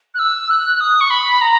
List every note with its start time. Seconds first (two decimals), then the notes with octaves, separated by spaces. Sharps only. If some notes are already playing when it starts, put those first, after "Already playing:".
0.14 F#6
0.19 E6
0.50 F#6
0.80 D#6
1.01 C#6
1.10 B5
1.41 A#5